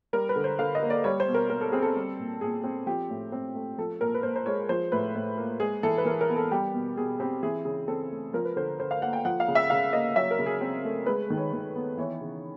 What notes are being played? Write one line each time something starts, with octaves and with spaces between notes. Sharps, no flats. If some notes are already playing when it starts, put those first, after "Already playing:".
G3 A#4
B4
D3
C5
D3 F5
D#5
A#3
D5
G3 C#5
C5
B2
A#4
B2 A#4
A4
C4 G#4
A4
G3
A#2
A#2 G#4
C4
F3 G4
A2
C4
A3
F3 A4
A#2 A#4
B4
A#2 C5
C5
G#3 C#5
F3 C5
A2 B4
A2
A#3
G#3 G#4
E3 A4
B4
E3 A#4
A#4
B3
A4
G3 G4
B2
B2 G#4
C4 G4
E3 G#4
C#3 G#4
C4 A4
A3
F3 A#4
B4
D3 C5
D3 C5
F5
A#3 F#5
G5
F3 F#5
F5
C#3
E5
C#3 F5
A#3 D#5
F#3 E5
A#4
C#3
G#4
C4
A3
G#3 B4
D#3
C#5
D#3
B3
E3 C#5
C#3